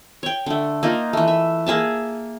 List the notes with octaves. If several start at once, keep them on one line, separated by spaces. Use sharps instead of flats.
C#5 G5
D3 A3
A#3 D#4 F4
E3 A3
E5
A#3 G#4 E5 A5